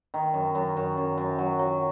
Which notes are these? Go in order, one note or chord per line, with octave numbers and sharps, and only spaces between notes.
D#3
F#2
F#2
F#2
F#2
F#2
F#3
F#3